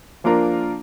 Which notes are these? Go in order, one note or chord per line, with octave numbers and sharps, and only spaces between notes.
F3 A#3 D4 F4 A#4